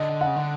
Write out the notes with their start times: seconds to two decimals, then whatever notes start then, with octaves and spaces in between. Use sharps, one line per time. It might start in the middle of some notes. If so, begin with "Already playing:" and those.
Already playing: D3 D#5
0.21 F#5
0.26 C#3
0.36 D3